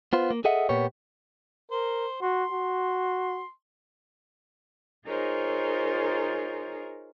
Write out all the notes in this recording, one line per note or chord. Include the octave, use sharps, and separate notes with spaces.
B3 F4 C5
A#3
G#4 A4 D#5 E5 F#5
A#2 A#3 B3 G4 C#5
A#4 C5
F#4 C6
F#4
D#4 F4 G#4 A#4 C5 C#5